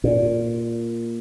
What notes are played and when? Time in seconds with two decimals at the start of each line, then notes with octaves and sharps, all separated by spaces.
0.04 A#2